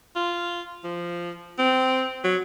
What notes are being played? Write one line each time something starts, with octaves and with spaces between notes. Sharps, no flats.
F4
F3
C4
F#3